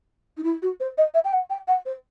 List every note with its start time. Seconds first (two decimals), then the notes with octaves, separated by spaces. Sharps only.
0.37 D#4
0.44 E4
0.62 F#4
0.80 C5
0.98 D#5
1.14 E5
1.25 G5
1.33 F#5
1.50 G5
1.68 F#5
1.86 C5